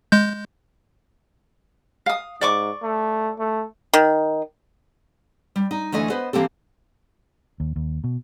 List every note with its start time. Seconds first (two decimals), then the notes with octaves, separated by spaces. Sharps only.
0.12 G#3 G6
2.06 F5 D#6
2.41 G#2 D5 C#6 D6
2.83 A3
3.39 A3
3.94 D#3
5.56 G3
5.71 D#4
5.92 D2 E3 A3 D#5 G#5
6.10 B3 B4 C5 D#5
6.33 E3 A#3 C4 G4 A4
7.60 D#2
7.76 D#2
8.04 B2